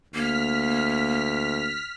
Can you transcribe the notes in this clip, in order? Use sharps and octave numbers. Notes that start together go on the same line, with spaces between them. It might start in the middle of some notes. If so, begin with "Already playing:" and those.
D2 A#3 F6 B6